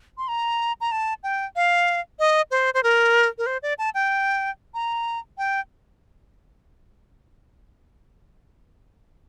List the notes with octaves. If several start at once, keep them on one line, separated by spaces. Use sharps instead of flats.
C6
A#5
A#5
A5
G5
F5
D#5
C5
C5
A#4
A#4
C5
D5
A5
G5
A#5
G5